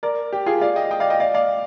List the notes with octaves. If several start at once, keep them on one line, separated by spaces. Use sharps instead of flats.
A#4 D5
G4
F4 G#4
D5 F5
D#5 G5
D#5 G5
D5 F5
D#5 G5
D5 F5
D5 F5